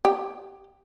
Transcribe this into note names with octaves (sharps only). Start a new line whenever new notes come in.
G4